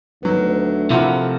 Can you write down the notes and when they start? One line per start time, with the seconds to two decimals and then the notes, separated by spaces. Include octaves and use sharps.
0.23 D2 D#3 F#3 B3
0.90 C3 F3 E4 F4 A4 A#4 F#5